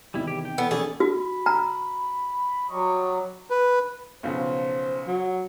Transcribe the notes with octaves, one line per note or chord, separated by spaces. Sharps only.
E2 C3 D#3 G3 E4
G4
G5
E3 B3 A4
F3 A#3 C#4 D#4 F4 G#4 A4 D5
F#4 B5
A#5
F#3 G3 D#5 C#6
B4
B1 C#3 F3 C5
F#3